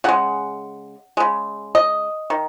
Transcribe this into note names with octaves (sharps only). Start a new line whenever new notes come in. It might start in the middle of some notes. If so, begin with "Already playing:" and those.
C#3 G#3 F#5
C#3 G#3
D#5
D#3